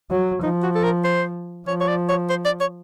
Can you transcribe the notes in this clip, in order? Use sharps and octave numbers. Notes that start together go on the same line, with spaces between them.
F#3
F3 D#4
F#4
A4
A#4
C5
F3 C#5
C#5
D5
C#5
C5
D5
C#5